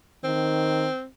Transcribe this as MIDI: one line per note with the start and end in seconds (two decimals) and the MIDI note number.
0.24 0.88 51
0.24 1.05 60